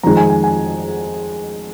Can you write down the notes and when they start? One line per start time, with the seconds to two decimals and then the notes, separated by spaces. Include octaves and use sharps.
0.03 F2 D#3 G#3 A#5
0.17 G#5
0.30 G#5
0.44 G#5